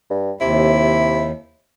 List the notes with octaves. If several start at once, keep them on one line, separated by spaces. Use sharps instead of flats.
G2
D#2 C3 E4